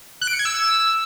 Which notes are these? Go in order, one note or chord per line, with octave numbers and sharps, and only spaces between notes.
F#6
D7
C#7
G#6
E6